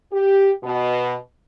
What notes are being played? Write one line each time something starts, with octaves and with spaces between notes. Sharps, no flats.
G4
B2